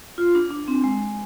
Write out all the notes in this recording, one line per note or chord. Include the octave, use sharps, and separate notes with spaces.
F4
D4
D4
C4
G#3